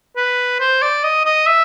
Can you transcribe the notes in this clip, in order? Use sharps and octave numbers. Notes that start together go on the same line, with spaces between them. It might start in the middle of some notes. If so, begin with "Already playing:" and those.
B4
C5
D5
D#5
D#5
E5